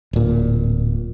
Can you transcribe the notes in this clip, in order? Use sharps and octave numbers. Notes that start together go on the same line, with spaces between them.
D1 A#2